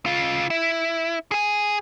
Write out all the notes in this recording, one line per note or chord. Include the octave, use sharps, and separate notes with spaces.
C#3 F4
E4
G#4 G#5